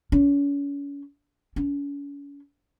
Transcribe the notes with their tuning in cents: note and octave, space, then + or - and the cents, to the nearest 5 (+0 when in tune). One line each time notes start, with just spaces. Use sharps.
C#4 +35
C#4 +40